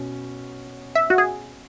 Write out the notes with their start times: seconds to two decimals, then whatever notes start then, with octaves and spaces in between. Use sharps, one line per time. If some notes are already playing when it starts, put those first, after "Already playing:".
Already playing: B2 C#4
0.95 E5
1.10 F#4
1.18 G#4